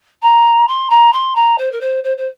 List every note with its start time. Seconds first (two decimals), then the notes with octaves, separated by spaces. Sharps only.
0.22 A#5
0.67 C6
0.89 A#5
1.12 C6
1.35 A#5
1.58 C5
1.71 A#4
1.80 C5
2.03 C5
2.17 C5